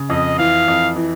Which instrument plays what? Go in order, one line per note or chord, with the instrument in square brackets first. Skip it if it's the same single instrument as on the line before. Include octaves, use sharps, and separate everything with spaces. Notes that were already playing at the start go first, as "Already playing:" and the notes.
Already playing: [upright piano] C#3
[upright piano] F2 [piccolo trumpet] D#5
[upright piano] E3 [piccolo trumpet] F5
[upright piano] F2
E3